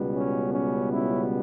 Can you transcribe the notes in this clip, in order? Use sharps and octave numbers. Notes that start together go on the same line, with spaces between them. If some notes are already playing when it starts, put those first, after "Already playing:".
Already playing: C#2 B2 G3 B3
C#4
C#4
C#4 E4